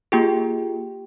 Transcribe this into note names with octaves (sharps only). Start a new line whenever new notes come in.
A#3 F4 G4 G#4 G5